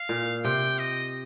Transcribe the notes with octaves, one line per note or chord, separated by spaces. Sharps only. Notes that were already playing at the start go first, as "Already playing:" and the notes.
Already playing: F5
A#2
C3 G5
D#5